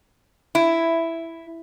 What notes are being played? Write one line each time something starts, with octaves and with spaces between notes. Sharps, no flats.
E4